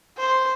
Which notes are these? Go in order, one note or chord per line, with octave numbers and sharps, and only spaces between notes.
C5